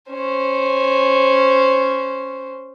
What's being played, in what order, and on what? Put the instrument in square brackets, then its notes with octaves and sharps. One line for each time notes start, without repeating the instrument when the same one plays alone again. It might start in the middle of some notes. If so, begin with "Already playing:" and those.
[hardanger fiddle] C#4 C5